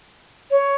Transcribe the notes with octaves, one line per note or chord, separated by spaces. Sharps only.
C#5